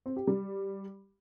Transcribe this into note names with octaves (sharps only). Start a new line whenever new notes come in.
C4
G4
G3